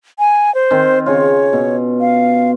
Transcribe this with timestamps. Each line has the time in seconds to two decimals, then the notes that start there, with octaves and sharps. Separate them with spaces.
0.19 G#5
0.55 C5
0.71 D#3 C4
1.06 C#3 F4 C#5
1.53 B2
2.00 F5